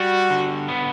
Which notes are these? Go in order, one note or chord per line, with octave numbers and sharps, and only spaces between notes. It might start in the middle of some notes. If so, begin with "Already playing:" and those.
Already playing: G3 F#4
D3
B3